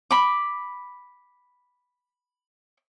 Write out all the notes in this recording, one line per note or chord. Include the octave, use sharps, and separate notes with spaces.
B5 D6